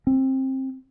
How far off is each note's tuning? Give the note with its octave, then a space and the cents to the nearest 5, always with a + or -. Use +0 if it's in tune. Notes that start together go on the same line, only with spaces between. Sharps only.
C4 +20